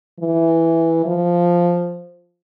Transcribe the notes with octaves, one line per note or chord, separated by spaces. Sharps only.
E3
F3